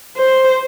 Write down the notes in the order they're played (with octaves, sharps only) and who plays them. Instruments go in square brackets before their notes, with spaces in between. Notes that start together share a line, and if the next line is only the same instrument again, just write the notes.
[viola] C5